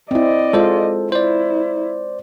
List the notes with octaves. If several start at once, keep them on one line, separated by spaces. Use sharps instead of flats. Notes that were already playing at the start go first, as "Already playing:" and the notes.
C4 E4 D5 D#5
G#3 F4 A4 C5
E4 C5 D5